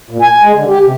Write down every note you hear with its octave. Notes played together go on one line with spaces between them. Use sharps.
A#2
G#5
G#3
D3
G4
C3